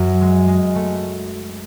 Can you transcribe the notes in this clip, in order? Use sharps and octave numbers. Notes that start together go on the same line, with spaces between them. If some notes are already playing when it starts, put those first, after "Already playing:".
Already playing: F#2 F#3
G#3
G#3
A3